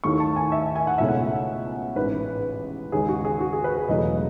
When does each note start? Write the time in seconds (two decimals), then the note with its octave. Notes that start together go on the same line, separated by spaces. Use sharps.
0.04 D#2 D#3 A3 E4 C#6
0.20 A5
0.36 G#5
0.52 E5
0.76 G#5
0.87 F#5
0.98 C#2 B2 A3 C#4 E4 E5
1.08 F#5
1.96 A1 G#2 E3 B4
2.92 D#2 C#3 G#3 G#4
3.09 F#4
3.25 G#4
3.41 F#4
3.53 G#4
3.64 B4
3.77 G#4
3.88 E1 E2 C#3 F#3 A3 D#5